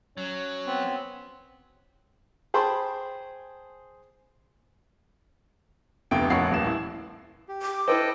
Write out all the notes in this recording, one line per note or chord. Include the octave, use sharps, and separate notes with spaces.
F#3 C#4
B3 C4
G#4 C5 G5 A5 B5 C6
F1 D2 C3 B3 G5 D7
F1 A#1 C#5 F#5 C7
D#1 A1 E7
E4
G4
D6
E4 A4 B4 C5 D#5 G5